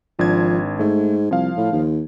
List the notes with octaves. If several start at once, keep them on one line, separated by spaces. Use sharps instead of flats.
G#1 F3 D4 G#6
G#2 A3
C2 F3 F5
A2
D#2